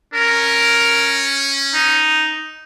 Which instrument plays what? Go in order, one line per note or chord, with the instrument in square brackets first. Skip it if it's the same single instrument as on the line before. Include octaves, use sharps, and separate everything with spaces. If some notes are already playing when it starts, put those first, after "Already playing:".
[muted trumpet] C#4 [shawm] A#4
[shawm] D#4